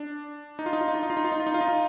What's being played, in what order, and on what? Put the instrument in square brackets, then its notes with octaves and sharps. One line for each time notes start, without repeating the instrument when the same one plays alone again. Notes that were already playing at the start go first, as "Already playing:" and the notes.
Already playing: [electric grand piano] D4
D#4
F4
D#4
F4
D#4
F4
D#4
F4
D#4
F4
D#4
F4
D#4
F4
D#4
F4